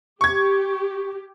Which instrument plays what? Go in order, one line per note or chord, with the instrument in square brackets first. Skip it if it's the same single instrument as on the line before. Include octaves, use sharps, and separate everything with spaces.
[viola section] G4 [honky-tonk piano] C#6 G#6